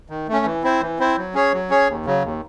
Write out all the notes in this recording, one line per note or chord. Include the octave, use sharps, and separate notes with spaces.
D#3
A3 C#4
E3
C4 E4 C5
E3
C4 E4 C5
F#3
C#4 G#4 C#5
F#3
C#4 G#4 C#5
D#2
C#3 F#3
D#2